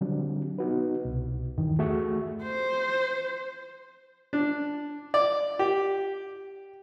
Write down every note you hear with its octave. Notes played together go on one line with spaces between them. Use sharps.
D3 F#3 G3 C4 D4
B3 D#4 F#4 B4
C2 B2
E2 G2 D#3 E3
A3 F#4 G#4 E5 C#6
C5
D4
D5
G4